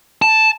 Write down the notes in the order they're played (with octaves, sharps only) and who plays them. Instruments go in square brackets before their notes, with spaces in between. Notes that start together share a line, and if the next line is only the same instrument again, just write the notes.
[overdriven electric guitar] A5